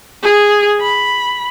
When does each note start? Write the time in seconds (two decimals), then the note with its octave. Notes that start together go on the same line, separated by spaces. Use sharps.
0.23 G#4
0.81 B5